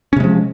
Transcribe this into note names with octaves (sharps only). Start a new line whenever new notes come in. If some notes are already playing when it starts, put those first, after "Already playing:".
C3 F3 G#3 C#4